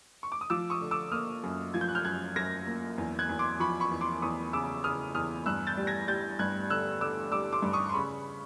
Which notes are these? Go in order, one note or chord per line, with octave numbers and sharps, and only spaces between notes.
C#6
D6
D#6
F3 D6 E6
C#6 D#6
D3
D6 E6
A#3 D#6 F6
F#2
F3 G#6
G6
F#6
F6 G6
F#2 F#6 G#6
F#2 G#6 A#6
A#3
E2
F#6 G#6
E2
C6 D6
F3 B5 C#6
B5 C#6
E2
C6 D6
E2 C#6 D#6
C#3 D6 E6
C#3 D#6 F6
E2 D#6 F6
G2 E6 F#6
G6 A6
G3
G#6 A#6
G3 G6 A6
G2 F#6 G#6
D3 E6 F#6
D3 D6 E6
G3 D6 E6
C6 D6
G2
C#6 D#6
C6
C#3 B5 C#6